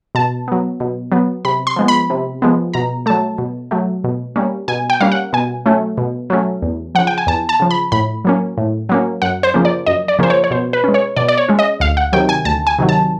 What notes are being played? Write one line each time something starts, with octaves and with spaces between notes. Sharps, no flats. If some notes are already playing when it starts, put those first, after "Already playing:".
B2 A5
F#3 B3
B2
F#3 B3
C3 B5
C6
F3 G#3 B3
B5
C3
F3 G#3 B3
B2 A#5
F#3 A3 A5
B2
F#3 A3
B2
G3 A#3 C#4
B2 G#5
G5
G3 A#3 C#4 F5
F#5
B2 G#5
F#3 A3 C#4
B2
F#3 A3 C#4
E2
C#3 F3 F#5
G5
G#5
E2 A5
A5
C#3 F3
B5
A2 B5
F#3 A#3 C#4
A2
F#3 A#3 C#4
F#2 F#5
C5
C#3 F3 A#3 C#4
D5
F#2 D#5
D5
C#3 F3 A#3 C#4 C5
C#5
C#5
B2 C5
B4
G#3 C#4
C#5
B2 D5
D5
C#5
G#3 C#4
D#5
D2 F5
F#5
C3 D#3 F#3 G5
G#5
D2 A5
G#5
C3 D#3 F#3
A5